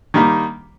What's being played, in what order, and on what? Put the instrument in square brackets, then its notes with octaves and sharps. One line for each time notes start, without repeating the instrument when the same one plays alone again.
[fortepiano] D#3 G3 A#3